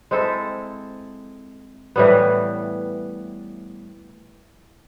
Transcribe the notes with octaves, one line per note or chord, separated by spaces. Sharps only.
G#3 C4 E4 A4
A2 E3 G3 B3